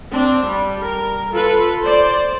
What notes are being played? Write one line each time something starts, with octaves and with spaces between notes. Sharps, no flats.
C4 D4
G3
A#4
F4 A4 B4
C5 D5